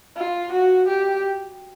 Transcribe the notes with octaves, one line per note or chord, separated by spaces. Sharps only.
F4
F#4
G4